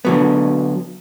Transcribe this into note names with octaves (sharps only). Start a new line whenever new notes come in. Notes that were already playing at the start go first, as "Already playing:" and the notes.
D3 F#3 B3